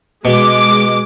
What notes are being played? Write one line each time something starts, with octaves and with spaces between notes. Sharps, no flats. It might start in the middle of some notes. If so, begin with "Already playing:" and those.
B2 G#3 D6